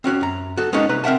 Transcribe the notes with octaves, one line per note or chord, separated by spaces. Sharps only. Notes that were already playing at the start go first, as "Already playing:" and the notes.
C4 C#4 F#4 C#5
F#2 A#5
F#4 A4
G#3 A#3 B3 C#4 D#4 C#5
C2 B4 A#5
C4 A#4 E5 F#5 A5